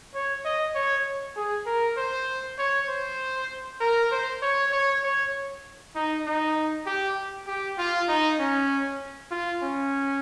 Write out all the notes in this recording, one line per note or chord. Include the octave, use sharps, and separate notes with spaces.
C#5
D#5
C#5
G#4
A#4
C5
C#5
C5
A#4
C5
C#5
C#5
C#5
D#4
D#4
G4
G4
F4
D#4
C#4
F4
C#4